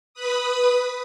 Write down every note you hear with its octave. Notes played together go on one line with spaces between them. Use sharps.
B4 B5 D#6